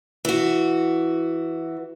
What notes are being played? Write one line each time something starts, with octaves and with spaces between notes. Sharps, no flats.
E3 F#4